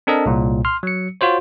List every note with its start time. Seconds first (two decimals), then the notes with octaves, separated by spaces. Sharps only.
0.07 C4 D4 A4 A#4 D#5
0.26 C2 A#2
0.65 C6 F6
0.83 F#3 C#7
1.21 F4 F#4 C5 C#5